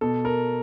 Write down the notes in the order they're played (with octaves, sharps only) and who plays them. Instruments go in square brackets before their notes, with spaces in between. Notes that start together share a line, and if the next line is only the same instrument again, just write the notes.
[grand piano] B2 A4
A#4